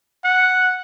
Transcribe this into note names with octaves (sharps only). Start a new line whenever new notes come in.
F#5